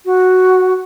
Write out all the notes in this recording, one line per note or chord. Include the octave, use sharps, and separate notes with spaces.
F#4